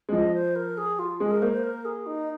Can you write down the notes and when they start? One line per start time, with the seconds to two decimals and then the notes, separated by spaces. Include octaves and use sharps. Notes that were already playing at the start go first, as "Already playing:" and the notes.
0.09 G#3
0.12 F3 D#5
0.34 C5
0.55 A#4
0.77 G#4
0.99 F4
1.20 G#3 G#4
1.31 A#4
1.42 A#3 C5
1.52 C5
1.63 A#4
1.85 G#4
2.06 D#4